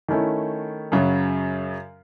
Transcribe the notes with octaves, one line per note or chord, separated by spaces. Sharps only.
D#3 A3 C#4 E4
F#2 C#3 F#3